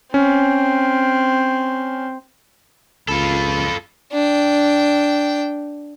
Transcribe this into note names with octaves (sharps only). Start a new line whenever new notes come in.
C4 C#4
C#2 F4 A4 B5
D4 G5